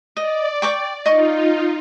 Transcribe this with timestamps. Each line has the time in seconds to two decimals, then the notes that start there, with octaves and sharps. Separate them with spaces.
0.17 D5 D#5
0.62 G5 C#6 D6
1.06 D#4 F4 D#5 C#6